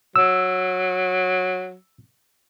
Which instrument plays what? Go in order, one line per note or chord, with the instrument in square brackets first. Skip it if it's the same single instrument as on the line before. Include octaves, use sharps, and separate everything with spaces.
[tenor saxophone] F#3 [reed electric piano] E6